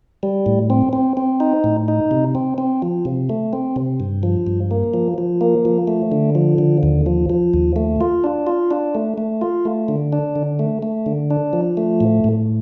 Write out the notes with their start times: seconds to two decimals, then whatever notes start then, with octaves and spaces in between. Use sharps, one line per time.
0.23 G3
0.46 A2
0.70 C4
0.93 C4
1.17 C4
1.40 D#4
1.64 A2
1.88 D#4
2.11 C3
2.35 C4
2.58 C4
2.82 F3
3.05 C3
3.30 A3
3.53 C4
3.76 C3
4.00 G2
4.23 F3
4.47 G2
4.71 A#3
4.94 F3
5.18 F3
5.41 A#3
5.65 F3
5.88 A3
6.12 D3
6.35 F3
6.58 D3
6.83 D#2
7.06 F3
7.30 F3
7.54 D#2
7.76 A3
8.01 F4
8.24 D4
8.47 F4
8.71 D4
8.95 A3
9.18 A3
9.41 F4
9.65 A3
9.88 D3
10.13 D4
10.36 D3
10.59 A3
10.82 A3
11.06 D3
11.30 D4
11.53 F3
11.77 A3
12.01 A2
12.24 A2